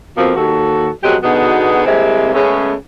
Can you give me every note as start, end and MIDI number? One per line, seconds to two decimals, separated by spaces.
0.17 0.32 41
0.17 0.32 47
0.17 0.32 53
0.17 0.32 58
0.17 0.32 60
0.36 0.90 39
0.36 0.90 66
0.36 0.90 69
1.03 1.16 41
1.03 1.16 47
1.03 1.16 54
1.03 1.16 56
1.03 1.16 67
1.03 1.16 78
1.23 1.84 47
1.23 1.84 50
1.23 1.84 59
1.23 1.84 63
1.23 1.84 66
1.23 1.84 68
1.86 2.31 48
1.86 2.31 55
1.86 2.31 56
1.86 2.31 58
1.86 2.31 60
1.86 2.31 64
2.34 2.74 49
2.34 2.74 56
2.34 2.74 57
2.34 2.74 59
2.34 2.74 61